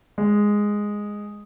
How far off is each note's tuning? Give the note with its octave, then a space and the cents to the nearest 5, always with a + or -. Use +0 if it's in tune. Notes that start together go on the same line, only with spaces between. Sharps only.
G#3 -5